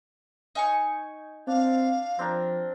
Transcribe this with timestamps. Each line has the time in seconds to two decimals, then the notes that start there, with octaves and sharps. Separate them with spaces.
0.55 D#4 G#5 C#6
1.47 C4 D4 F5
2.19 F3 C4 D4 A#4